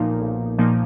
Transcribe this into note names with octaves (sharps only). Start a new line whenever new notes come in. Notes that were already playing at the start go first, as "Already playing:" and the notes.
Already playing: B1 A#2 F3 A#3 D#4
B1
A#2 F3 A#3 D#4